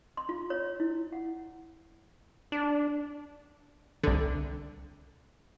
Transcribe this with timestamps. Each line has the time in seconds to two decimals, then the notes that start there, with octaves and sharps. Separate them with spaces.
0.17 C6
0.29 F4
0.50 C#5
0.80 E4
1.12 F#5
2.52 D4
4.03 C2 D3